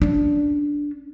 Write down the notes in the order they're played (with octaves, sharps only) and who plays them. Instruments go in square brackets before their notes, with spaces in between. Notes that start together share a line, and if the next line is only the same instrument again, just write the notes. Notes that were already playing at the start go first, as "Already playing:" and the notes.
[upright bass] C#4 D4